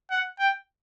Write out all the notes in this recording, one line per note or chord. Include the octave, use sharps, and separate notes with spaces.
F#5
G5